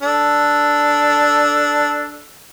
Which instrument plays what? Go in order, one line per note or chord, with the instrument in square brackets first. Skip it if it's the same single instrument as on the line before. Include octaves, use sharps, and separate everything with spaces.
[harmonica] D4 A4